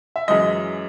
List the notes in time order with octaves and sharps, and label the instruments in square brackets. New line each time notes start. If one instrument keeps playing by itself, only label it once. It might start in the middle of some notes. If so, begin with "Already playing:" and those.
[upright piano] E5
F#2 E3 G#3 D#5